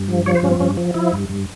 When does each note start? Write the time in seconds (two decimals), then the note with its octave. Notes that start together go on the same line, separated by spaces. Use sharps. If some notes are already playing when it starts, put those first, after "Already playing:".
Already playing: G2
0.08 F3
0.26 F3 C#5
0.35 C5
0.43 G2 C#4
0.51 C4
0.60 G2 C#4
0.77 F3
0.94 F3 E4
1.13 G2
1.29 G2